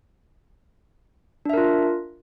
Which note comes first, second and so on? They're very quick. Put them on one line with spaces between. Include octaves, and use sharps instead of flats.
D4 E5 A#4 F4